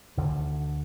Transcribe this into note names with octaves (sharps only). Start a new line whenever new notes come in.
D2 D3 D#3